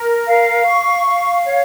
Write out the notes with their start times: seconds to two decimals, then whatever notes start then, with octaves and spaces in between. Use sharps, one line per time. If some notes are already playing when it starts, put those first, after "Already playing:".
Already playing: A#4
0.27 F5
0.66 C#6
1.06 F5
1.44 C#5